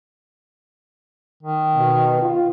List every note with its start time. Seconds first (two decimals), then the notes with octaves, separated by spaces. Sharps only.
1.43 D#3
1.76 B2
2.22 F4